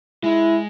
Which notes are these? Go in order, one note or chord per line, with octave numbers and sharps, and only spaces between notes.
G#3 E4